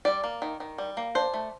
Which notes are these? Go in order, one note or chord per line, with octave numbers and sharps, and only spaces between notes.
G3 D5
A#3
D#3
D#3
G3
A#3
D4 C5
A3